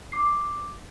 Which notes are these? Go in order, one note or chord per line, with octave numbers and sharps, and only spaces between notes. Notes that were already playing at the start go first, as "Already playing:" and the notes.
D6 C7